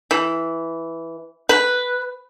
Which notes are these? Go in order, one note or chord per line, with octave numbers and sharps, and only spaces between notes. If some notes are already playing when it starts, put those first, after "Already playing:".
E3
B4